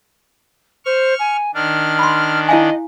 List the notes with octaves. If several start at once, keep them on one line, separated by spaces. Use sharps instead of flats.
C5 C#6 F6
G#5
D#3 D4 F6
B5 C6
E4 D#5 F5 G#5